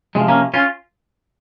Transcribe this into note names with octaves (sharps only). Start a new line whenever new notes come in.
C3 F3 G#3
A#3 C#4
C#4 F4